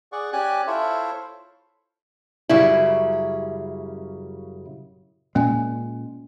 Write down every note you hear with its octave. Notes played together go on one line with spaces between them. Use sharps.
G#4 D5 F#5 C#6
C#4 G4 D5 G#5 F#6
E4 F4 A4 C5 C#5 E5
F#2 C#3 G3 E4
A#2 G#3 C#4 G#5